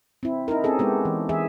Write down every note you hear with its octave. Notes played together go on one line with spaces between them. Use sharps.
C4 E4
D#4 E4 A#4
C4 C#4 G#4 A4
G#3 B3 G4
E3
E3 G#4 E5